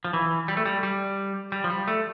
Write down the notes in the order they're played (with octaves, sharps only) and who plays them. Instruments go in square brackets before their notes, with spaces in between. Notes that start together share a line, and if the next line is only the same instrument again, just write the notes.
[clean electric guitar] F3
E3
G3
A3
G3
G3
G3
F3
G3
A3